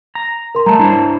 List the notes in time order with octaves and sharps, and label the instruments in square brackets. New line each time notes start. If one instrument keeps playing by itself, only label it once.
[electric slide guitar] A#5
[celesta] A#4 C6
[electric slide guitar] G3 A3 [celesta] A5 A#5
[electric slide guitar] D4 E4 C5